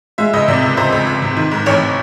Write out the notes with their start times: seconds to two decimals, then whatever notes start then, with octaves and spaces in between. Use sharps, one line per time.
0.18 G#3 E5
0.33 C#2 D#5
0.48 C3 D5
0.62 C#2
0.77 C#2 C5
0.92 C#2
1.07 C#2
1.22 C3
1.37 D#3
1.51 G#2
1.66 A1 C#5